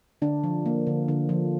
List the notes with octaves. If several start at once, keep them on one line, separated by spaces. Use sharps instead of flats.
D3 D4
F3
A#3
D3
D3
F3